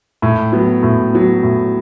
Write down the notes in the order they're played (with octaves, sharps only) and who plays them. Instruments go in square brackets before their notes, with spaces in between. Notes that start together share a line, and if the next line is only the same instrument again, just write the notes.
[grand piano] A2
F#3 B3
A2
F#3 B3
A2